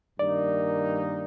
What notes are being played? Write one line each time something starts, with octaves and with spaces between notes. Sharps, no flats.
G2 D#3 A#3 D#4 D5